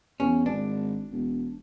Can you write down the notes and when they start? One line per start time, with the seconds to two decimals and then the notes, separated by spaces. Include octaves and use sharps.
0.20 E2 C#4
0.46 G#1 D4
1.11 E1